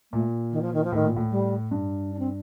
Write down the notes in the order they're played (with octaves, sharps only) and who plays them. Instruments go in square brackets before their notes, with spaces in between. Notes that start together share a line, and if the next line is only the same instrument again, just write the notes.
[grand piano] A#2 [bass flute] A3
[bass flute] D#3
F3
D#3
F3
[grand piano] A2 [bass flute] D#3
[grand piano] A#2
A2
[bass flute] G3
[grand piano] G2
[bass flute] D4
C4